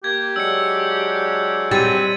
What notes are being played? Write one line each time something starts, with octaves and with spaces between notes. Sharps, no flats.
A#3 G4 G#6
F#3 G#3 D4 E6 C#7
G3 C4 A6 D#7